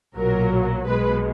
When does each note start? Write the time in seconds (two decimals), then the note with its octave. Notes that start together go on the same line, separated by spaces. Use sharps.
0.16 B1 A#2 F#3 A#4
0.85 B1 B2 G#3 B4